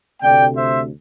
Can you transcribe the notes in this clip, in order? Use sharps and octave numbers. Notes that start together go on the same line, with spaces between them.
D2 C3 A3 D5 G5
C5 E5